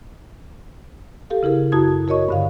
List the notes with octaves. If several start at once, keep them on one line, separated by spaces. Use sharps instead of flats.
G4 A4 F5
C#3 E4 G#4 A#4
F#2 E4 F#4 A5 D#6 G#6
F#4 A#4 C#5 D#5 C#6
G2 D3 F5